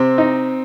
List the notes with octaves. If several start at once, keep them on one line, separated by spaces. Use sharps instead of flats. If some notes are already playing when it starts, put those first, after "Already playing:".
Already playing: C3 C4
D#4